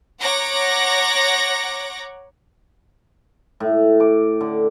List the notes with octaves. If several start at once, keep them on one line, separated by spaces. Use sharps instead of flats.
C#5 F#5 A#5 D6 A#6
A2
D6
D3